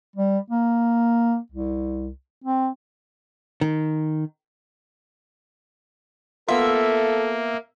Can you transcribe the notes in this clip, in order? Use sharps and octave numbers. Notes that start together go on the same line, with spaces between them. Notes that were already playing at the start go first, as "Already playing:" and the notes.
G3
A#3
C2
C4
D#3
A#3 B3 F4 A4 E5